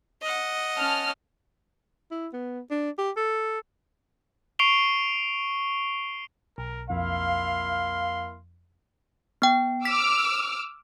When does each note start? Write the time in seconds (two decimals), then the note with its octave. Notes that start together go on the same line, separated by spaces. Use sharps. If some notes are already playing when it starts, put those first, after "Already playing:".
0.22 D#5 F#5
0.77 C#4 A5 F6
2.11 E4
2.33 B3
2.71 D4
2.98 G4
3.16 A4
4.59 C#6 C7 D7 F7 G7
6.58 B1 A#4
6.90 F2 A#3 E4 F5 C6
9.42 B3 G5
9.85 D6 E6 F6 B6